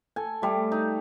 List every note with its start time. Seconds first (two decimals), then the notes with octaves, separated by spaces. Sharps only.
0.16 A4 G#5
0.42 G3 A3
0.72 D#4